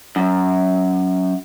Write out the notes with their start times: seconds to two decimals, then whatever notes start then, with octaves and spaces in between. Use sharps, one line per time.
0.16 F#2